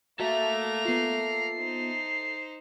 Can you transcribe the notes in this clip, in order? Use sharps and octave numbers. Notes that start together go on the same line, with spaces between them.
A#3 F#4 A4 E5 A#5
B3 F4 C7
D#4 C5